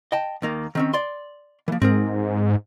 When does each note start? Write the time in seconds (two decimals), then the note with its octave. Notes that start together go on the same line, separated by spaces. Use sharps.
0.12 D#5 G5 A5
0.42 D#2 D#3 A#3
0.75 D#3 C4 C#4
0.93 D5 C6
1.68 E3 F3 A#3
1.82 G#2 C4 G#4 A#4